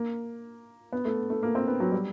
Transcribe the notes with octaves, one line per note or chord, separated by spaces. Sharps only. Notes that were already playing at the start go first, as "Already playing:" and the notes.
Already playing: A#3
B3
A3
A3
A#3
C4
B3
F#3
G3